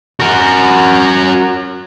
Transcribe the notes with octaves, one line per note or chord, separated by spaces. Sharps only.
F#4 A#4